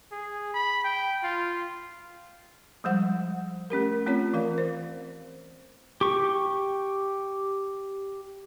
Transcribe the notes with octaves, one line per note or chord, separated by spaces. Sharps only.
G#4
B5
G5
F4
F3 G3 G#3 C5 F#5
A3 C#4 G4 A#4
A3 C4 C#4 F4 C#5
E3 A#4 F5
C5
G4 C#6